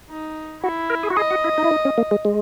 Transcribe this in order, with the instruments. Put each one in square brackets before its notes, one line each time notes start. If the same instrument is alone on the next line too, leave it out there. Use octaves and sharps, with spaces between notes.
[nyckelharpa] D#4
[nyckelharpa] E4 [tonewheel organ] F#4
[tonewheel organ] A#4
G#4
F#4
[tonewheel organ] G#4 [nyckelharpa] D#5
[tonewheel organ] F#4
E4
D#4
E4
D#4
C#4
A#3
G#3
G#3